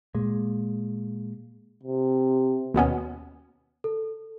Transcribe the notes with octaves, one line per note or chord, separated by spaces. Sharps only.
A#2 G#3
C3
D#2 B2 B3 C#4
A4